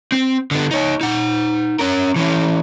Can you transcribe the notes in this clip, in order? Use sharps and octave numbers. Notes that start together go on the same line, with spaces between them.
C4
D3 B3
D#4 C#5
D#4 F#5
C#4 A#4
E3 C#4